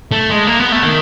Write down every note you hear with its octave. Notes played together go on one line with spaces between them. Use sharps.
A3
G#3
A#3
B3
A3
D#3